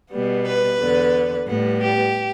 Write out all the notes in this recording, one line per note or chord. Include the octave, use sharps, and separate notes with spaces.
B2 G3 B3
B4
E2 D3 B3
A2 G3 B3
G4